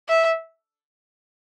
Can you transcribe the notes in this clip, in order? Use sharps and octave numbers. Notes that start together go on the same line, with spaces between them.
E5